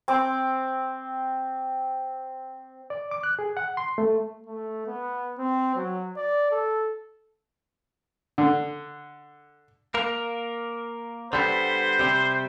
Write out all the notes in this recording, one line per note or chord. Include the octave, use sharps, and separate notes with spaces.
C4 D6
D5
D6
F#6
G#4
F#5
C6
A3
A3
B3
C4
F#3
D5
A4
D3
A#3 A#4
D3 G3 B3 C5
C3 G3